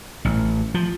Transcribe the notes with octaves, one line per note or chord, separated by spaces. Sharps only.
A1
F3